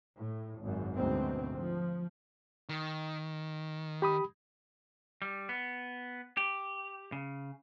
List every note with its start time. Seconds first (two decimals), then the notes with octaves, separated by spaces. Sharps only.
0.18 A2
0.61 G#1 F#2
0.95 D2 G#2 B2 C4
1.57 F3
2.69 D#3
4.02 G4 B5 D#6
5.22 G3
5.49 B3
6.37 G4
7.12 C#3